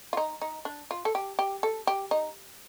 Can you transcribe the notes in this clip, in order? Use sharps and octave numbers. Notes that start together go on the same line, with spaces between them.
F4
D#4
D#4
D4
F4
A4
G4
G4
A4
G4
D#4